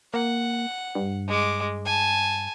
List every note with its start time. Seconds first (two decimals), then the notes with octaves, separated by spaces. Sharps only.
0.14 A#3 F#5
0.95 G2
1.28 G#3 D6
1.86 G#5 A5